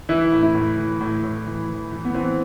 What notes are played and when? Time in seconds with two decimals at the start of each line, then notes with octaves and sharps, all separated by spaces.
0.09 E3 E4
0.32 A2
0.43 E4
0.55 A2
0.77 E3
1.01 A2
1.23 A2
1.46 E3
1.69 E3
1.91 E3
2.05 B3
2.15 E3 C4